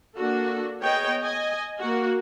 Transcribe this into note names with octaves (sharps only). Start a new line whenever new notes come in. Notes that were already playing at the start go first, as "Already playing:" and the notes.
A#3 D4 F#4 A4
B3 G#4 C#5 D#5 G5
D#5 G#5
A#3 F#4